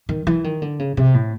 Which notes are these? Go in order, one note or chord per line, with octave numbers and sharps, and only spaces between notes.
D#3
E3
D#3
D3
C#3
C3
A2